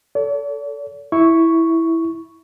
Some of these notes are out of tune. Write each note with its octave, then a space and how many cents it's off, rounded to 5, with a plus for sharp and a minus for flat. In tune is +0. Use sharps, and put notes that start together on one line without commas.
A4 +15 D5 -45
E4 -5 C#6 +0